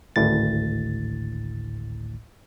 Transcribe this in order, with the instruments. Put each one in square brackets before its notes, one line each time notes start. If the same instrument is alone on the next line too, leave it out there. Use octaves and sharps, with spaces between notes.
[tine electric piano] G#1 D2 A2 A6